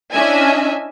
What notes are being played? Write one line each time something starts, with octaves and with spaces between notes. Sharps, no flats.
C#4 D4 E4 D#5 E5 G#5